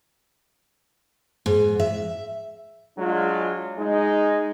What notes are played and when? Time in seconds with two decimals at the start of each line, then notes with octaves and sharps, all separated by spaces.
1.46 G#2
1.80 E5
2.98 F#3 G#3 D4 F4
3.77 G#3 D#4